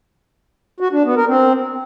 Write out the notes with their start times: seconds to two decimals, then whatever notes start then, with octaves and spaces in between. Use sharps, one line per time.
0.80 F#4
0.92 D4
1.04 B3
1.16 A#4
1.28 C4